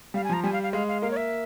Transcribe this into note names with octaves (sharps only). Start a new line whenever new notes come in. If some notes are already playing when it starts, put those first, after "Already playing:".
G3 F5
G#5
F3 A#5
G3 G#5
F5
F5
G#3 F5
F5
A#3 F5
C#5
E5